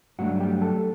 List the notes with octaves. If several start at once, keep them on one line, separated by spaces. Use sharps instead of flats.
G2 F#3 A3 D4 F#4 F#5
G4 G5
A4 A5